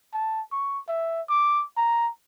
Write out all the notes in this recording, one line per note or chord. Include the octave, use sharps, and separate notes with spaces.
A5
C#6
E5
D6
A#5